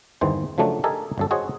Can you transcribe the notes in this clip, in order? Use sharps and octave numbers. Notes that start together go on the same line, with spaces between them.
G1 E2 D#3 E3 C4 C5
C#3 F3 F#3 A3 D4
G4 A4 A#4 D#5 E5 G#5
G1 F#2 A4
F#4 G#4 C5 C#5 D#5 F#5